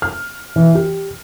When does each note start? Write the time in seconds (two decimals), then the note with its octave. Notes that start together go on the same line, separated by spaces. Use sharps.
0.02 F6
0.56 E3
0.75 G4